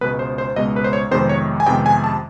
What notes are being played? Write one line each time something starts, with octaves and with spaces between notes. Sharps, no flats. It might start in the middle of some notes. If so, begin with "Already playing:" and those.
C#2 B2 G#3 B3 B4
C5
C5
C#2 B2 G#3 B3 D#5
B4
C5
C#5
F2 C3 D#3 G#3 B3 C5
C#5
G#5
F2 C3 D#3 G#3 B3 G5
G#5
A5